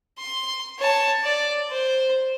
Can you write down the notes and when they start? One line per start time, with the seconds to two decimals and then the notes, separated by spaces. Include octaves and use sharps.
0.18 C6
0.79 C#5 A5
1.24 D5
1.71 C5